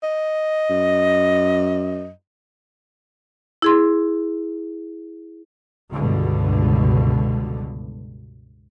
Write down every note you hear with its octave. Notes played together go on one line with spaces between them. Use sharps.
D#5
F#2
E4 G#4 C6
C#2 G2 B2 D3